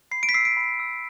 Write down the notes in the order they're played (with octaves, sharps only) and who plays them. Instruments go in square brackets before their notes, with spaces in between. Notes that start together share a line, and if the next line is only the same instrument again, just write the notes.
[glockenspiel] B5 C7
D7
B6
E6 C7
D7
B5
E6